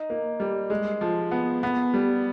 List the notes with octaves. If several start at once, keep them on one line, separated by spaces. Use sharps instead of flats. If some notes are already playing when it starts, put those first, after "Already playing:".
Already playing: D#4
A#3
G3
G#3
F3
B3
B3
G3